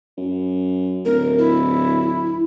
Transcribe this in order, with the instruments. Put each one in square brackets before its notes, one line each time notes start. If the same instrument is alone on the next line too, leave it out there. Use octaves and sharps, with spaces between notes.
[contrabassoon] F#2
[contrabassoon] D1 [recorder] A#4
[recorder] E4